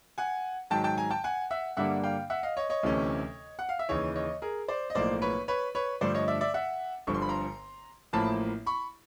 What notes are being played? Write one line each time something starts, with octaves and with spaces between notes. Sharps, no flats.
F#5 G#5
G#2 D#3 F#3 G5 A5
G5 A5
G#5 A#5
G5 A5
F#5 G#5
E5 F#5
G2 D3 G3 A#3 D4 E5 F#5
F5 G5
E5 F#5
D#5 F5
C#5 D#5
C#5 D#5
D2 C3 E3 A3 C#4
F#5
F5
E5
D#2 C#3 E3 C#5 D#5
C#5 D#5
G#4 A#4
C5 D5
D#5
B1 A2 F3 A#3 C5 D5
B4 C#5
B4 C#5
B4 C#5
G2 D3 F3 A3 C5 D5
C#5 D#5
D5 E5
D5 E5
E5 F#5
G1 G2 D3 F3 C#6
C6
B5
A#5 C6
A1 A2 F3 A#3 A5 B5
B5 C#6